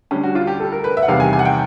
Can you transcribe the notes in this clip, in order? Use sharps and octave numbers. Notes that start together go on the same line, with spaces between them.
D2 D3 G3 C#4
F#4
F4
G4
A4
A#4
B4
E5
F#5
E2 C3 D#3 G3 F5
G#5
G#5
F#5
G5